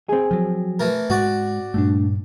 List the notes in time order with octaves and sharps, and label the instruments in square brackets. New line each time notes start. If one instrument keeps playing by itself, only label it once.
[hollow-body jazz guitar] C4 G#4
[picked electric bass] F3 F#3
[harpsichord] E3 A3 A#4
[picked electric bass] G#2 G#3 [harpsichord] F#4 D5
[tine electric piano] G2 A#2 [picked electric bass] A3 D4